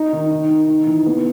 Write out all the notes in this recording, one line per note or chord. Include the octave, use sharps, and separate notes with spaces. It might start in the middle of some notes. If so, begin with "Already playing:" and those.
Already playing: D#4
D#3
D#4
D#3
D#4
E3
B3